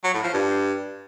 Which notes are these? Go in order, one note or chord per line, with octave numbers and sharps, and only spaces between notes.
F#3
A2
F3
G2